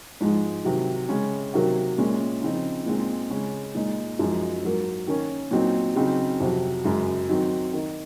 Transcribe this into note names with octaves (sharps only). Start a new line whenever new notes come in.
G#2 F3 G#3
C3 D#3 F#3
C#3 G#3 C#4
C3 D#3 F#3 A#3
A#2 G#3 C#4
C#3 F3 C4 D#4
A#2 G#3 C4 D#4
C#3 G#3 C#4
A#2 G#3 D#4
F#2 F3 G#3 D#4
G#2 F#3 A#3
D#3 A#3 C#4
A#2 F#3 C4 D#4
C#3 F#3 C4 D#4
F2 C3 F#3
F#2 C#3 G#3
D#3 F#3 C4 D#4
D#3 A#3 D#4